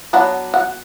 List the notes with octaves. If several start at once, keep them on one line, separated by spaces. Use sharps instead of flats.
F#3 B3 D4 F#5
F#5